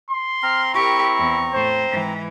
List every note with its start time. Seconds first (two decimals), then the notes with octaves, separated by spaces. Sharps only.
0.10 C6
0.43 C4 A#5 F6
0.74 E4 G4 A#4 C#6
1.18 E2
1.54 A2 C5
1.90 G#2 E3